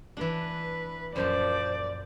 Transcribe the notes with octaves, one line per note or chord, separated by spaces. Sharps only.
E3 D4 B4
F#2 A#2 F3 C5 D5 A5